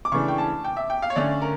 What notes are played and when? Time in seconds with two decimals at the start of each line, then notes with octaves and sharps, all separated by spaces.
0.05 D6
0.12 C#3 E3 A3 D4 C#6
0.28 G5
0.38 A5
0.64 G5
0.77 E5
0.90 G5
1.02 F5
1.10 C#5
1.16 D3 A3 C#4 D5
1.42 A#4